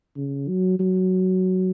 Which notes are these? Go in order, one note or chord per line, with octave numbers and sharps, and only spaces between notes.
C#3
F#3
F#3